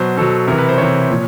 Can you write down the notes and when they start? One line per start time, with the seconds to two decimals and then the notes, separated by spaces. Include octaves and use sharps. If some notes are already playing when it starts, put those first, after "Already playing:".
Already playing: B2 F#3 C5
0.17 B2 F#3 A4
0.47 C3 E3 A#4
0.58 B4
0.69 C5
0.78 C3 E3 C#5
1.09 A#2 F3